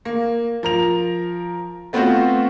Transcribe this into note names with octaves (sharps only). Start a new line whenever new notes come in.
A#3
F3 A#4 F7
A3 B3 C4 F4 F#4 C5